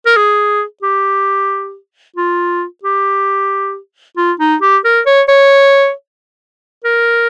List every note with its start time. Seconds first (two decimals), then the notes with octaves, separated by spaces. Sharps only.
0.06 A#4
0.16 G#4
0.83 G4
2.17 F4
2.84 G4
4.17 F4
4.40 D#4
4.62 G4
4.85 A#4
5.06 C#5
5.28 C#5
6.85 A#4